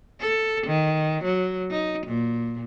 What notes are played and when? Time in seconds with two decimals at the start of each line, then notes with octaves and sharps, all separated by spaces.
0.20 A4
0.67 D#3
1.24 F#3
1.71 D#4
2.07 A#2